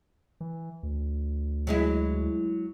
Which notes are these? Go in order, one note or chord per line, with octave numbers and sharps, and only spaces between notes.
E3
D2
F#3 G#3 E4